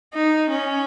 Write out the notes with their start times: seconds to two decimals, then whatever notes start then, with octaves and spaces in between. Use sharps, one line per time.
0.14 D#4
0.50 C#4